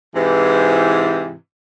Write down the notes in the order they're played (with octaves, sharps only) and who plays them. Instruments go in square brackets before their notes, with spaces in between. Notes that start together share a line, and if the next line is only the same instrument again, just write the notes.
[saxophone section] G#2 C3 E3